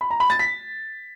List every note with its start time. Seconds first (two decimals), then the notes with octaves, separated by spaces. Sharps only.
0.01 B5
0.10 A#5
0.20 B5
0.30 A6
0.39 B6